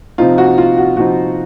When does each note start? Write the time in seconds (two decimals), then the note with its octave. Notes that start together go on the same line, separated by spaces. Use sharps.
0.18 C3 F3 C4 D#4 F4
0.38 F#4
0.58 F4
0.78 F#4
0.97 C3 F3 C4 D#4 F#4